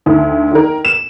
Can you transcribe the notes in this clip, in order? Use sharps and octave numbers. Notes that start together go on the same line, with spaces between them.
D2 D#3
D#3 A#4
E7